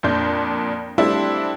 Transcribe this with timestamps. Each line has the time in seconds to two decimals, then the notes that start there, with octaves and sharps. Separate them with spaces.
0.03 F2 A#2 D4 G6
0.98 G3 A3 C4 D4 E4